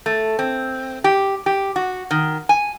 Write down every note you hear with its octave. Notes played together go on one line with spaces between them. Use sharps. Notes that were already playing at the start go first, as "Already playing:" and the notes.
A3
C4
G4
G4
F#4
D#3
G#5